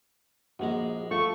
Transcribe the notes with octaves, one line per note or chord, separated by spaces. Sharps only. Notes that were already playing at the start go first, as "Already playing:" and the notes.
A#1 G#3 A#3 F#4 A#5
A3 F4 C#6